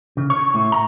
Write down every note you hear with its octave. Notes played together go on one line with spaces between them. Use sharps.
C#3
C#5
A2
A#5